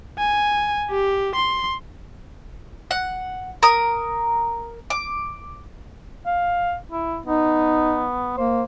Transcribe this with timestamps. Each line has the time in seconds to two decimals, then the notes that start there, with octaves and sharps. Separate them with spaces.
0.18 G#5
0.91 G4
1.35 C6
2.91 F#5
3.63 A#4 D#6
4.90 D6
6.26 F5
6.92 E4
7.26 B3 D#4
8.37 A#3 C5